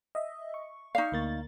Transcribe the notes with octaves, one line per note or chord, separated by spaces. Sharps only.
D#5 E5
C#6
D#4 D5 F5 C#6
D2 A#3 A6